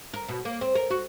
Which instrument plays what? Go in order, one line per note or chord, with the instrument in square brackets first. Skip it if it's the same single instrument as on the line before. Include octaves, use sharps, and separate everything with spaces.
[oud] A#4
B2
A#3
C4
A#4
F#4